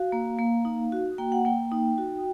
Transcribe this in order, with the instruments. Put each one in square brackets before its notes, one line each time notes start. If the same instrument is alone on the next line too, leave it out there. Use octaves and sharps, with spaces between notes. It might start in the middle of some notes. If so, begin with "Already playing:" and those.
Already playing: [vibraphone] F#4 F5
A#3
A#3
D#4
F#4
A#3 G5
F#5
A#3 G5
D#4
F#4